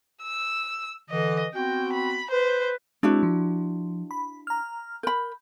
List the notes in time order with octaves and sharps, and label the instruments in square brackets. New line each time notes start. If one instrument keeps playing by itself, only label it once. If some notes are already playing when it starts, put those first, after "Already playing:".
[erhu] E6
[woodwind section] D3 E3 [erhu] D#5
[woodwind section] B3 C4 F#4 [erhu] G5
[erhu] B5
[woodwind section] B4 [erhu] C5
[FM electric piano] G#3 C4 [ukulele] D4 E4 F#4
[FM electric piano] F3
B5
A#5 F6
[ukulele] A#4 B5 [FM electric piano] G6